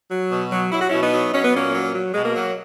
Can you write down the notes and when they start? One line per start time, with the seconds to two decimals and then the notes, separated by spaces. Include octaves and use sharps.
0.11 F#3
0.31 B2
0.51 F#3
0.72 F#3 E4
0.81 F#4
0.89 B2 C#4 E4
1.02 B3 D#4
1.13 F#3
1.33 F#3 C#4
1.45 B3
1.54 A#2 A#3 C#4
1.74 F#3
1.94 F#3
2.14 B2 G#3
2.25 A#3
2.36 F#3